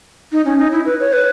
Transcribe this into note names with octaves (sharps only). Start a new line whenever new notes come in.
D#4
C#4
D#4
E4
B4
C#5
B4